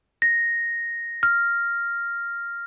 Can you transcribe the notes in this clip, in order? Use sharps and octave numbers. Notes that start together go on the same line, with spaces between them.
A#6
F6